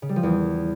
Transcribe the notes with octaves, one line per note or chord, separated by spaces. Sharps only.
C#3
G3
F3
E2